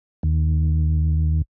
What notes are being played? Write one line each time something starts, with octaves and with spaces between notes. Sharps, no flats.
D#2